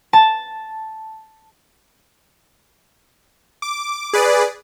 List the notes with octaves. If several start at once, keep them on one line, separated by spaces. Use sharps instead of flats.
A5
D6
G#4 B4 D5